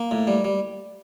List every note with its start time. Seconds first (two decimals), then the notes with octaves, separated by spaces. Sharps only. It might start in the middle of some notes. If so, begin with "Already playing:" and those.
Already playing: A#3
0.11 A2
0.27 G3
0.44 G3